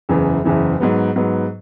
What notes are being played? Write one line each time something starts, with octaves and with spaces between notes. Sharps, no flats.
F#1 E2 C#3 E3
F#1 E2 C#3 E3
G#2 F#3 B3
G#2 F#3 B3